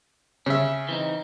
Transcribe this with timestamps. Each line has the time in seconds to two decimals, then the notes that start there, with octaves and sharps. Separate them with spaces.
0.46 C#3 C#4 E5
0.89 E3 C4 D#4